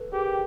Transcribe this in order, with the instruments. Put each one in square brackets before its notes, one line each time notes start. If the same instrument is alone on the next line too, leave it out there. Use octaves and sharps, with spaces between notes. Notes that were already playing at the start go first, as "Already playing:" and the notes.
Already playing: [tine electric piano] A4 B4
[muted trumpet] G4 [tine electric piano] G#4 A#4